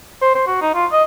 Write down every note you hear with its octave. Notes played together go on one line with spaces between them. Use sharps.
C5
C5
F#4
D#4
F4
D#5